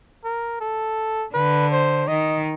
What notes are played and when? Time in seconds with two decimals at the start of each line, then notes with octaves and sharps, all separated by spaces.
0.24 A#4
0.60 A4
1.34 D3 B4
1.72 C5
2.08 D#3 D#5